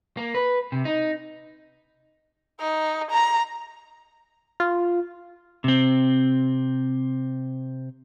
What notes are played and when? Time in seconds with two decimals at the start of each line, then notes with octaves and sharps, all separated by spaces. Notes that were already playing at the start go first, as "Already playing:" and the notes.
0.17 A#3
0.35 B4
0.72 C3
0.85 D#4
2.60 D#4
3.11 A#5
4.60 F4
5.64 C3 C4